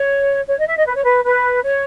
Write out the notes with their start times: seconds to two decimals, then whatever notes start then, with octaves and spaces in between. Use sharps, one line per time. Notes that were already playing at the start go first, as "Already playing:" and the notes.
Already playing: C#5
0.48 C#5
0.58 D#5
0.68 E5
0.78 D#5
0.87 B4
0.96 C#5
1.05 B4
1.25 B4
1.63 C#5